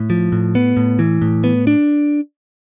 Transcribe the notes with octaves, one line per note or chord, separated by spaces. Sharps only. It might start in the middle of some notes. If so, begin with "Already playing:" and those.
Already playing: A2
F3
A2
B3
A2
E3
A2
B3
D4